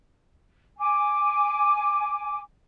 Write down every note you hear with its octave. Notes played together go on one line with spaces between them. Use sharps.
G#5 D6